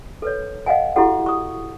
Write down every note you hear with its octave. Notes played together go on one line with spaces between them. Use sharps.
A4 B4 C#5
D#5 F5 F#5 G#5
E4 F#4 G4 A4 F#5
C#6 D#6